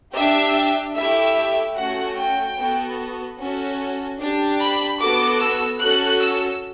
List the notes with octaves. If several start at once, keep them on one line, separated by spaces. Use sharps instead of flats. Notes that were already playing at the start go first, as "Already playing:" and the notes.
D4 G4 E5
A3 E4 G4 E5
A3 C#4 F#4 F#5
G5
B3 F#4 A4
C#4 F#4 A4
D4 G4
B5
B3 F#4 A4 D6
E6
C#4 F#4 A4 F#6
E6